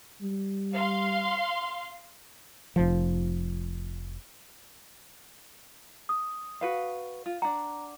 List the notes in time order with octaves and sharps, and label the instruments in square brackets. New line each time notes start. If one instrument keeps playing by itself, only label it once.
[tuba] G3
[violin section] F5 C6
[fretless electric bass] F1 F3
[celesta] D#6
[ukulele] F#4 B4 F5
F4
[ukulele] D4 F#5 [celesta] A#5